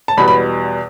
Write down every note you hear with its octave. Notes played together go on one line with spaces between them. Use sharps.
A5
E2 B2 G3 B3 B5
B5